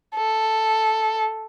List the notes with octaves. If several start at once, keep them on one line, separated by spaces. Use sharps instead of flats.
A4